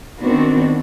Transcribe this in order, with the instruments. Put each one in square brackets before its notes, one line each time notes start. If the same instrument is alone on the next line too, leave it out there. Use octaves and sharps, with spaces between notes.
[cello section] D#3 B3 C4 D4 F#4